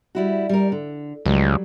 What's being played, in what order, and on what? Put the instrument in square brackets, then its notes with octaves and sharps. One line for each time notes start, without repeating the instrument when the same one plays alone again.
[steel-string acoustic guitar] G3 E4 F#4
G3 A#4
D3
[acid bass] C#2 [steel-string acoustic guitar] F#3 G3